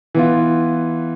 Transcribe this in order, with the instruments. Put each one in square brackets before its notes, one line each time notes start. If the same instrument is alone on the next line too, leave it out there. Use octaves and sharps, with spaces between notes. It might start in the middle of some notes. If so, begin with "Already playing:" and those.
[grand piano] E3 B3 F4